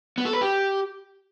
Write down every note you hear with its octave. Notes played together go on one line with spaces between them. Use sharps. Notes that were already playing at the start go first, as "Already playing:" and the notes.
B3
A4
B4
G4